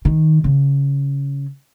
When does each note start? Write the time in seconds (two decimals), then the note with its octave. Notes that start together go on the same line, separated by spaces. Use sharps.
0.05 D#3
0.44 C#3